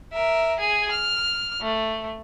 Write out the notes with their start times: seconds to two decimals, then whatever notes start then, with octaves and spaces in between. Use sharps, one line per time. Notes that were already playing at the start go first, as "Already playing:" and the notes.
0.13 A#4 E5
0.59 G#4 G#5
0.91 F6
1.61 A3